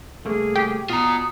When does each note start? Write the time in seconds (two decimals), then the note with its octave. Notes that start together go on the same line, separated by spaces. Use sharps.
0.25 C2 A3 A#3 G#4
0.55 G4
0.90 B2 F4 A#5 D#6